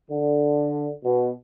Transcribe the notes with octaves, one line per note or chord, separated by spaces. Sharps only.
D3
B2